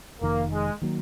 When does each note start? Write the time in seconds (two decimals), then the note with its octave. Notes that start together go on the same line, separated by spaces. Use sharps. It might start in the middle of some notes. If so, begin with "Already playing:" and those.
0.21 F1 F2 D#3 A#3
0.51 G#3
0.82 D#3 F#3 A#3